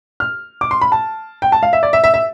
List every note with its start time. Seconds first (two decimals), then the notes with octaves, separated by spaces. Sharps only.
0.20 F6
0.61 D6
0.71 C6
0.81 B5
0.92 A5
1.42 G5
1.52 A5
1.63 F5
1.73 E5
1.83 D5
1.93 E5
2.04 E5
2.14 E5